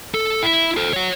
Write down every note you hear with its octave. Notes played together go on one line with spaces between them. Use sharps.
A4
E4
A4 C5
C#5 F#5